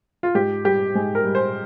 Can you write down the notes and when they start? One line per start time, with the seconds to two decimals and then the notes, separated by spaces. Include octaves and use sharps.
0.23 F4
0.35 G#2 G4
0.65 G3 G4
0.95 G#2 G#4
1.15 A#4
1.25 G3
1.35 C5